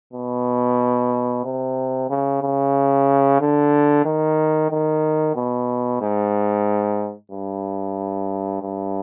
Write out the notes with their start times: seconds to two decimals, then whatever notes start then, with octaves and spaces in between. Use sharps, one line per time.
0.13 B2
1.45 C3
2.10 C#3
2.42 C#3
3.41 D3
4.05 D#3
4.71 D#3
5.36 B2
6.01 G#2
7.31 G2
8.62 G2